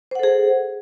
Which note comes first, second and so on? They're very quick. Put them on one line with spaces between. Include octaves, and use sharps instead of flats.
C5 F#5 A4 G#4